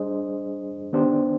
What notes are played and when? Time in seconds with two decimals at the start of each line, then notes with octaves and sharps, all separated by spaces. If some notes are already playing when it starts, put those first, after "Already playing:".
Already playing: G3 D4 G#4 C5 D#5
0.93 D#3 B3 D4 G4 C5